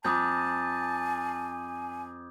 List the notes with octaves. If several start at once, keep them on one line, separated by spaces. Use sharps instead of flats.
F2 G#5 A5 D6 D#6 G6